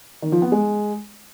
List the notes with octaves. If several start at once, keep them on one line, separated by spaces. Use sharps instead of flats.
D#3
F3
B3
G#3